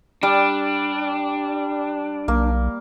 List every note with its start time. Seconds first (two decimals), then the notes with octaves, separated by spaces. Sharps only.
0.23 G3 D4
2.28 B1 A#3